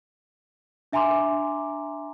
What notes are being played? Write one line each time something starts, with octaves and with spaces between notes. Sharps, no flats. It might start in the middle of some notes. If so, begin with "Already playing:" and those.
D4 E5 G#5 A#5 C6 D6